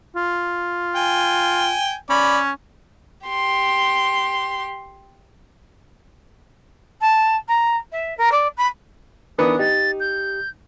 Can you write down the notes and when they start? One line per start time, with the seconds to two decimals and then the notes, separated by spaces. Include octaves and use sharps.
0.16 F4
0.95 G5 G#5
2.10 C#4 D5 B5
3.27 G4 C6
7.01 A5
7.48 A#5
7.92 E5
8.17 A#4
8.31 D5
8.57 B5
9.38 E3 B3 D4 D#4 A#4 D#6
9.59 D#4 G4 A6
10.00 G6